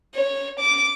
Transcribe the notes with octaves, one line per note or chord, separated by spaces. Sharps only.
C#5
D6